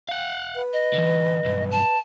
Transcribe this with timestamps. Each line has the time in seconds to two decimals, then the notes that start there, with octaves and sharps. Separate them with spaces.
0.09 F5 F#5
0.55 B4
0.73 D#5
0.93 D3 E3
1.45 B1 G2
1.71 A5